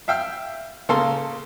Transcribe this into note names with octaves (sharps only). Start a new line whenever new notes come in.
E5 F5 G5 E6 F6
C#3 A#3 A4 C6